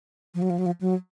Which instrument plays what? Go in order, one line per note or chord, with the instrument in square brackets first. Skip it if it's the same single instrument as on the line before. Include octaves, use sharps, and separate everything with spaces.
[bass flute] F3
F#3
F3
F#3
F3
F#3